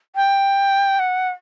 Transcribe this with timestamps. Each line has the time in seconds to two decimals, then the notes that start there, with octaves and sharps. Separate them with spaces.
0.16 G5
0.99 F#5